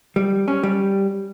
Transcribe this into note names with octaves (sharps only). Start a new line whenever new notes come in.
G3
C#4
G3